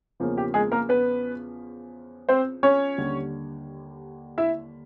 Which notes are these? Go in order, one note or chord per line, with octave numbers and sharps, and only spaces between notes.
E2 C#3 F3 A#3 C#4
G4
G#3 G#4
A#3 A#4
B3 B4
C4 C5
C#4 C#5
D#2 D3 G3
E4 E5